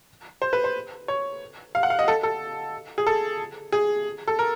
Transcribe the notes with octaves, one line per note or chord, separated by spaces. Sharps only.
C5
B4
C5
C#5
F5
F#5
F5
D#5
A4
A4
G#4
A4
G#4
A4
A#4